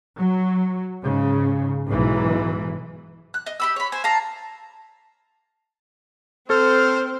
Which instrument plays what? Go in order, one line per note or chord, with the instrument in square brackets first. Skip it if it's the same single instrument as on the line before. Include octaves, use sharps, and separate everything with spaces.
[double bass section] F#3
G#2 C#3
B1 G#2 E3
[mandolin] F#6
D#5
G4 B5 E6
C#5 B5
C5 G#5
F5 A5 A#5
[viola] C4 [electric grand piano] A4 [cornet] C5 [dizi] F6